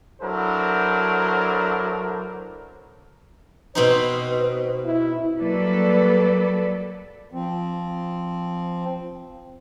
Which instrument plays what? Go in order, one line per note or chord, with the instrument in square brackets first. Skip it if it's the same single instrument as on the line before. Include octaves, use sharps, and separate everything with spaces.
[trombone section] F#3 D4 E4 A4 A#4 C5
[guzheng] B2 C4 D#4 [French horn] C5
[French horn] E4
[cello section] F#3 G3 A#3 A4 B4 D5
[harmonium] F3 C4